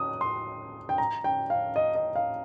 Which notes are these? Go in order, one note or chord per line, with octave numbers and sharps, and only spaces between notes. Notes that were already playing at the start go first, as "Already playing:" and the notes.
Already playing: D#6
C6
G5
A#5
G5
F5
D#5
D#5
F5